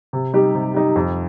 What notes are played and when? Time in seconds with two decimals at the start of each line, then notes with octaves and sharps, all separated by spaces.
0.13 C3
0.33 G3 D#4 G4
0.55 C3
0.74 G3 D#4 G4
0.96 F2